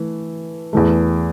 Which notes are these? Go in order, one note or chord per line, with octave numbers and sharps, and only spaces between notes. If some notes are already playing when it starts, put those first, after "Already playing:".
Already playing: E3 A3
E2 E3 A3